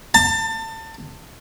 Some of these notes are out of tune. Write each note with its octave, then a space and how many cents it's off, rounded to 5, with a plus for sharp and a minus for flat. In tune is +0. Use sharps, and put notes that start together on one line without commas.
A5 +25